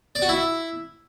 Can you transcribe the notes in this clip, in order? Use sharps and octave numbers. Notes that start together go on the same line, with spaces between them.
D5
F#4
E4